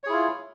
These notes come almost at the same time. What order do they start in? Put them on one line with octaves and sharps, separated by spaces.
C#5 G#4 E4 F4